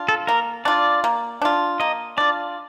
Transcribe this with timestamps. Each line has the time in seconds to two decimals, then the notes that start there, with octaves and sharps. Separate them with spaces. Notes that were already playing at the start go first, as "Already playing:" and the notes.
Already playing: D4 F4
0.08 A4
0.27 A#3 A#4
0.65 D4 F4 D5
1.04 A#3
1.42 D4 F4
1.80 A#3 D#5
2.17 D4 F4 D5